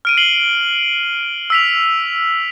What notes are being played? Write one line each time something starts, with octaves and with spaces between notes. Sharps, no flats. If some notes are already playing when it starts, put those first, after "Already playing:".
F6 D7 D#7
C7 F#7 G7
E6 B6 F7